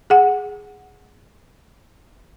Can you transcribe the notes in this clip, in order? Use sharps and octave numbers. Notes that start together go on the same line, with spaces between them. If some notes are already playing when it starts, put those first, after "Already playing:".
G#4 F#5